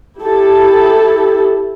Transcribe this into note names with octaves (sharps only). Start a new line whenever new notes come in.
E4 G4 A4